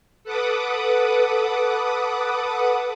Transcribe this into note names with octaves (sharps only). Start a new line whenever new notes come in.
A4 B4 F#5 D6 D#6